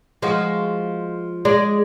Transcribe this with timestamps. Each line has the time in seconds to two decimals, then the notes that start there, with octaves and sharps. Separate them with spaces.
0.22 F3 G#3 F#4
1.45 G#3 D5